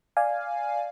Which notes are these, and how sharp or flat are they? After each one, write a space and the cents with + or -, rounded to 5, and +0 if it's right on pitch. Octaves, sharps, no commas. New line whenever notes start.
D5 +0 F5 +0 G#5 +0